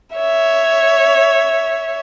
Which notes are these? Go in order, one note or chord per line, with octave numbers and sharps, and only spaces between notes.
C#5 E5